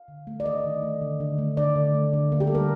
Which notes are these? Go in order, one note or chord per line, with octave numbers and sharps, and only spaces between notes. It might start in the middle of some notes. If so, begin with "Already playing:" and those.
Already playing: F5
D3
A3
D5
D#3 D#5
D#3
A3
D3
D3
A3
D3 D5
D3
A3
D3
A#3
G4
A4
G3 A#4